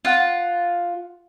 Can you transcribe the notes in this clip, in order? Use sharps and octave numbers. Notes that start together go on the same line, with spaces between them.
F4 F#5